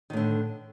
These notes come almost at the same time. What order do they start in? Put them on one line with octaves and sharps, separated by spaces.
D#3 A2 D3